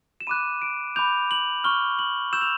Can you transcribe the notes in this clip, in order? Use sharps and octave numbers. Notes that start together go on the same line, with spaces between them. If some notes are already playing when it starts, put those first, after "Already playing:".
E7
B5 D6 F#6 D#7
D7
B5 D6 G6 F7
F#7
C#6 F6 G7
F#7
C#6 E6 G6 E7
F7